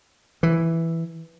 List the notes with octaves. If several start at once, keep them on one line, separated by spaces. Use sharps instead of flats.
E3